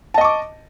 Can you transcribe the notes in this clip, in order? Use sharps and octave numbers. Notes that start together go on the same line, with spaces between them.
D#5 A5 C#6 D6